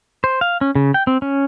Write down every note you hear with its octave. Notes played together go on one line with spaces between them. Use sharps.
C5
F5
C#4
C#3
G5
C4
C#4